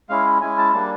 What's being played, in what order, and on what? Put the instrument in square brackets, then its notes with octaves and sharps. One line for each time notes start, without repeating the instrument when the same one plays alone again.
[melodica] G#3 C#4 E4 F5
G#3 C#4 E4 G#5
A5
G3 A#3 D4 A5